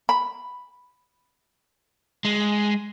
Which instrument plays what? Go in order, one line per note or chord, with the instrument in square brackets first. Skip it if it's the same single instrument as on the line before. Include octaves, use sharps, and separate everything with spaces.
[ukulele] B5
[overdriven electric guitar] G#3